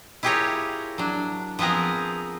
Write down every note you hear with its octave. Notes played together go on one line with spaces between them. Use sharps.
E4 F4 G4 G#4 A#4 C#5
F#3 D4
F3 B3 C4 G#4 A#4